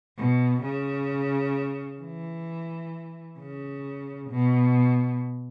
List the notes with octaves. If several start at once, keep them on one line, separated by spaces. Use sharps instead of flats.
B2
C#3
E3
C#3
B2